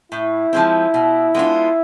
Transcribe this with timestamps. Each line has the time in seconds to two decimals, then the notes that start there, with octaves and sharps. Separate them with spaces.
0.12 A2 E4
0.53 F3 G#3 C4
0.94 B2
1.34 G#3 B3 D4 F4